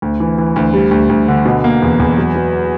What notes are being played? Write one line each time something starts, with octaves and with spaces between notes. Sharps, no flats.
D2
E3
E3
D2
G3
D2
D2
D3
B2
A#3
E2
E2
F#3
F#3